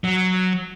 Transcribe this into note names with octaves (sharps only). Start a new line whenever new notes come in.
F#3